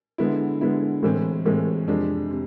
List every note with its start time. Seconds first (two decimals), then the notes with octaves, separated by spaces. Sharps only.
0.18 D3 G#3 B3 E4
0.61 D3 G#3 B3 E4
1.03 A2 E3 G#3 C4
1.45 A2 E3 G#3 C4
1.87 F2 C3 G#3 D4
2.31 C3